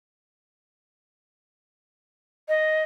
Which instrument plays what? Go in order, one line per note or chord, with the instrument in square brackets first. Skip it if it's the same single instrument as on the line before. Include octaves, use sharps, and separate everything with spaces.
[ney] D#5